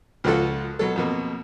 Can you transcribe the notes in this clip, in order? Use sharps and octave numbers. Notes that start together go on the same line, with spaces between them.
C#2 F3 F4 F#4 A4
B2 F#3 A4
F2 B2 A#3